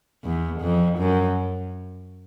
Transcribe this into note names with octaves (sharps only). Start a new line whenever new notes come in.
E2
F2
F#2